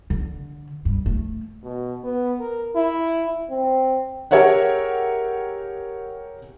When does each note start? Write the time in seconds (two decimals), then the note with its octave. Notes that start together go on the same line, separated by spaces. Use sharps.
0.10 D3
0.85 G2
1.06 A3
1.63 B2
2.04 B3
2.40 A#4
2.76 E4
3.50 C4
4.31 G4 G#4 A#4 C#5 E5 F#5